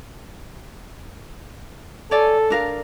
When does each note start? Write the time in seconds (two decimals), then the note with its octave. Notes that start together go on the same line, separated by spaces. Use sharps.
2.11 A4 C#5 D5 G#5
2.50 D4 A#4 F5